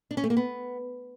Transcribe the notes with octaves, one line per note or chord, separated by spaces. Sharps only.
D4
C#4
A3
A#3
B3